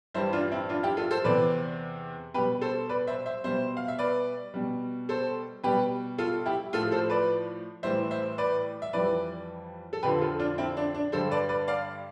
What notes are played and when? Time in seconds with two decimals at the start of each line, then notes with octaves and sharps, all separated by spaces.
0.14 G2 E3 G3 C5 E5
0.33 D4 F4
0.51 C4 E4
0.69 D4 F4
0.83 E4 G4
0.97 F4 A4
1.11 A4 C5
1.24 E2 C3 E3 B4 D5
2.34 B2 G3 G4 B4
2.61 A4 C5
2.89 B4 D5
3.07 C5 E5
3.26 C5 E5
3.44 B2 G3 C5 E5
3.77 F5
3.88 E5
3.99 B4 D5
4.54 B2 G3
5.09 A4 C5
5.64 B2 G3 G4 B4
6.18 F4 A4
6.46 E4 G4
6.73 A2 F3 F4 A4
6.92 A4 C5
7.10 B4 D5
7.83 A2 E3 G3 C5 E5
8.11 C5 E5
8.38 B4 D5
8.82 E5
8.93 F2 E3 G3 B4 D5
9.93 A4
10.03 F2 D3 F3 G4 B4
10.21 F4 A4
10.39 D4 F4
10.58 C4 E4
10.77 D4
10.94 D4
11.12 G2 D3 G3 A4 C5
11.31 B4 D5
11.49 B4 D5
11.68 D5 F5